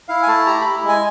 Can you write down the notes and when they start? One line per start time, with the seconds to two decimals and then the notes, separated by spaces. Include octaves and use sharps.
0.08 E4 F5
0.23 G#5
0.27 A3 A5
0.46 G4 A#5
0.61 E4 B5
0.84 G#3 G#5